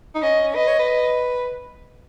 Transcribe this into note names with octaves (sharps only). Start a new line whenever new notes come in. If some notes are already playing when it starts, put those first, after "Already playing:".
D#4
C#4 D#5
B4 D#5
C#5
B4